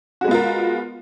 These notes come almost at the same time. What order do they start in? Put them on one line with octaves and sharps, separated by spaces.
F#4 G#3 B3 F4 A#4